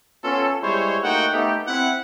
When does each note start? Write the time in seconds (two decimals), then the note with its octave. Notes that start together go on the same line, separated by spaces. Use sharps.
0.24 B3 C#4 F4 A4
0.63 G3 G#3 E4 C5 C#5
1.03 A3 A#3 D#4 F#4 F#5 G5
1.33 A3 B3 D#4 G4
1.67 C4 E4 F#5